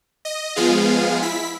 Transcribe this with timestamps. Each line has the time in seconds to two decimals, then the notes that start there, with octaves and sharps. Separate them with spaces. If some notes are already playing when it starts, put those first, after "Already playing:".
0.25 D#5
0.56 F3 G#3 B3 F4 G#4 F5
1.22 E4 B6